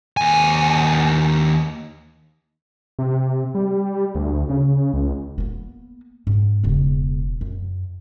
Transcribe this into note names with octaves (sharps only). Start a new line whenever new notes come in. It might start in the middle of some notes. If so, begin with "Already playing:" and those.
D#2 G#5
C3
G3
D2
C#3
C#2
A#3 B3
G#2
E1 C#3
F#2